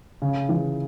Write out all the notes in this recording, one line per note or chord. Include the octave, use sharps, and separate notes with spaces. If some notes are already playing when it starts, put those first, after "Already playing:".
C#3
E3